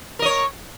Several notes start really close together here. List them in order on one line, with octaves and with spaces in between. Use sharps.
A#4 D#5 C#5